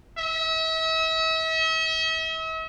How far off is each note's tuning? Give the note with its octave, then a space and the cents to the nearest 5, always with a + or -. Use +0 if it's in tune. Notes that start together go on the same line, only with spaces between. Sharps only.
E5 -40